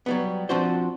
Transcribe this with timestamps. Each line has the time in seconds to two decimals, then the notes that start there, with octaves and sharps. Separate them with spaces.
0.06 F#3 G3 B3
0.49 F3 C4 D4 F#4 C5